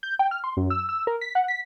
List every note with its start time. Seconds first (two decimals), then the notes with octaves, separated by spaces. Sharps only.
0.03 G6
0.19 G5
0.31 F6
0.44 C6
0.57 F#2
0.70 E6
0.89 E6
1.07 A#4
1.21 B6
1.35 F#5
1.48 B6